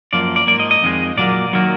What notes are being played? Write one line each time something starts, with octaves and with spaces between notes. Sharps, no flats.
F#2 F3 A#3 D5
D5
G#2 F3 A#3 D5
D#5
D#5
F2 D#3 G#3
A#2 F#3 A#3 D5
D#3 F#3 A#3